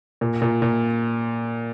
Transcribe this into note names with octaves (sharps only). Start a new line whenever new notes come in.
A#2
A#2
A#2